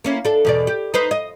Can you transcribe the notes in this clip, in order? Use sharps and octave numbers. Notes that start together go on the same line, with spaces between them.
A#3 C#4 E4
D4 A4
E2 B2 D5
G4
D#4 B4 C5
D#5